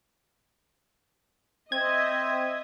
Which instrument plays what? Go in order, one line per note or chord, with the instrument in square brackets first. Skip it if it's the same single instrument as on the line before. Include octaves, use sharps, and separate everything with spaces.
[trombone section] C4 [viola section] D#5 E5 [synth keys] G#6